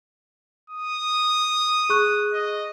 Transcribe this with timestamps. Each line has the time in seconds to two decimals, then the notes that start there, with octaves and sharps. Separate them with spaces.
0.70 D#6
1.89 G#4 C#6 F#6
2.33 D#5